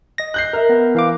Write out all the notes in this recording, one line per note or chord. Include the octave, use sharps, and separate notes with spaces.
D#5 A#6
F#6 G6 C7
A#4 E5
B3
E3 F5 D6